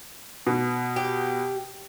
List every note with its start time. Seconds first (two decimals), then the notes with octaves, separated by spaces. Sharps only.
0.47 B2
0.96 G4